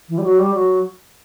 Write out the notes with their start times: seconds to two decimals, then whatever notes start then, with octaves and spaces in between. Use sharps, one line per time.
0.09 E3
0.18 G3
0.24 F#3
0.39 G3
0.54 F#3